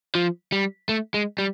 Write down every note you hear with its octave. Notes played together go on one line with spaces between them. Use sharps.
F3
G3
A3
G#3
G3